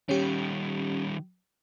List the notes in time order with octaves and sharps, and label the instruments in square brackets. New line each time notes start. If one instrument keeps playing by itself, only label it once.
[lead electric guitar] D#3 G3 [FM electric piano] C#4 G4